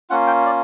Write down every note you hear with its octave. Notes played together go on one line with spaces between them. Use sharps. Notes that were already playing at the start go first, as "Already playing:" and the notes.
A#3 C#4 F4 F#5
G5
D5